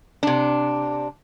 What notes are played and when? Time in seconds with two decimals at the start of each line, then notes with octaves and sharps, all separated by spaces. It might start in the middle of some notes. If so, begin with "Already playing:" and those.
0.23 C3 D4